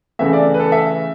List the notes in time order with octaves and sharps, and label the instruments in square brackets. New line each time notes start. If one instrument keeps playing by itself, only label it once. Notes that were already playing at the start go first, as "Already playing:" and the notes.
[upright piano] C#3 E3 A3 E5
D5
B4
A4
E5